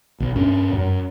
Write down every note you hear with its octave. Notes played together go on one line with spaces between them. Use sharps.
B1
G2 C#4
F#2